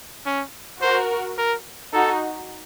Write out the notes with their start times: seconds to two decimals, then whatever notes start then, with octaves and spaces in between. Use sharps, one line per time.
0.26 C#4
0.81 F#4 A#4 C5
1.38 A#4
1.94 D#4 F#4 A4